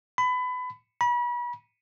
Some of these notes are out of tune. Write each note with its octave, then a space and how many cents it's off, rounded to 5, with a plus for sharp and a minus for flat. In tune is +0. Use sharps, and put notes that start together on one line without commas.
B5 +25
B5 -35